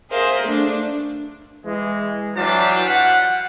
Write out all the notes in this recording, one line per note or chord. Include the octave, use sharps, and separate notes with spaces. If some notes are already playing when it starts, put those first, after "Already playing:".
G#4 A#4 C5 E5 F5
A3 D4
E3 G#3
E3 F#3 G3 D4 F4 A5
F#5